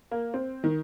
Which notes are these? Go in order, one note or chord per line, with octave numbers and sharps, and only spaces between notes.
A#3
C4
D#3